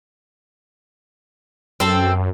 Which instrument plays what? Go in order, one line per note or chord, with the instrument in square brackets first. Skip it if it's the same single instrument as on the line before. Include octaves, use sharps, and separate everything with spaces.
[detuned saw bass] F#2 [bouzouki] C4 A4